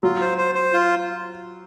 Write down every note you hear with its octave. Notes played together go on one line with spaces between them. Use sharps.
F#3 F4
C5
C5
C5
F4